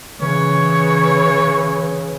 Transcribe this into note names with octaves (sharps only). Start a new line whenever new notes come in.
C#3 E3 C#5